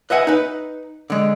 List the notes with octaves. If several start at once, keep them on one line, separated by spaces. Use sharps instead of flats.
B4 D#5 E5 F#5 G#5
D#4 B4
D3 G#3